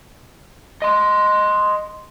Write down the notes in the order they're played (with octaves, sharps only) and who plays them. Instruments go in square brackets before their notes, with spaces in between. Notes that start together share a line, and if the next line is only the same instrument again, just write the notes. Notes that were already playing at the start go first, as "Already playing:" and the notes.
[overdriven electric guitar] D#5 C6